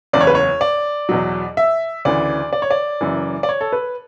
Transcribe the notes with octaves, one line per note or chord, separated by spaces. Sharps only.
F#1 E2 C#3 D5
C#5
B4
C#5
D5
E2 B2 F#3
E5
D2 C#3 E3 D5
D5
C#5
D5
F#1 F#2 E3
D5
C#5
A4
B4